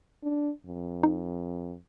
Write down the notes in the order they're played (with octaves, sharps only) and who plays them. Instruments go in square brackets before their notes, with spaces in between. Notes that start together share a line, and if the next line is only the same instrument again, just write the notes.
[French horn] D4
F2
[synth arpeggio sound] D#4